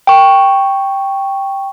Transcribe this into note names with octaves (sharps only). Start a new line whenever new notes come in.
G5 C#6